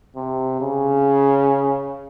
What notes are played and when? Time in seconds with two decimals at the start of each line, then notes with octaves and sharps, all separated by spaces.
0.16 C3
0.61 C#3